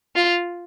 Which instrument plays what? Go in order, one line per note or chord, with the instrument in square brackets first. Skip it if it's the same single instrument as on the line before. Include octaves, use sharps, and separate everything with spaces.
[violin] F4